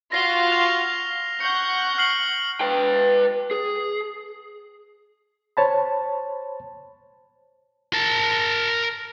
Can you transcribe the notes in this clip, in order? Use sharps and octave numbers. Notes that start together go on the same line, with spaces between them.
F4 F#4 F5 A#6 C7 G7
F6 F7
F#5 C#6 G6 C#7
F6 C7 F#7
B4 G5
G#4
C5 C#5 A5 B5
A#4 A5